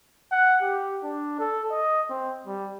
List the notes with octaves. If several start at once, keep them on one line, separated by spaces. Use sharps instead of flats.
F#5
G4
D4
A4
D#5
C4
G3